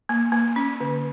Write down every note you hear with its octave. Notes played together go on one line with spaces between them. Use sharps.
A#3
A#3
C#4
D3